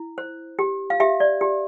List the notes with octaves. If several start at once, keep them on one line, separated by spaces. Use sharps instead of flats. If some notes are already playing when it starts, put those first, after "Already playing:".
Already playing: E4
C5
G4
F5
G4 E5
D5
G4